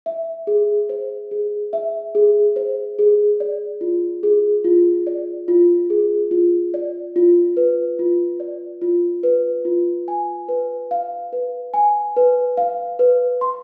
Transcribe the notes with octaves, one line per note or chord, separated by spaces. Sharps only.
E5
G#4
C5
G#4
E5
G#4
C5
G#4
D5
F4
G#4
F4
D5
F4
G#4
F4
D5
F4
B4
F4
D5
F4
B4
F4
G#5
B4
F5
B4
G#5
B4
F5
B4
C6